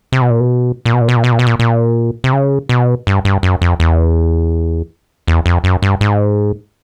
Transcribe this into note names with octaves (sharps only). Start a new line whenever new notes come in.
C3
B2
A#2
B2
A#2
B2
A#2
B2
A#2
B2
A#2
B2
A#2
A#2
C3
C#3
B2
G2
G2
F#2
F2
E2
E2
F2
F#2
G2
G#2